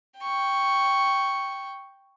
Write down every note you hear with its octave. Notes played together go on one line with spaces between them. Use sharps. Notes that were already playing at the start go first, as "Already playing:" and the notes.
G5 C#6